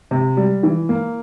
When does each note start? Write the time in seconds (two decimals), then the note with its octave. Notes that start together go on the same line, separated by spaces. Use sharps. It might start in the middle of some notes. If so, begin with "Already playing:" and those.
0.11 C3
0.37 G3
0.63 E3
0.89 A#3